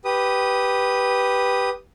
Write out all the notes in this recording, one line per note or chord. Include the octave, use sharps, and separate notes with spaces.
G4 B4 D#6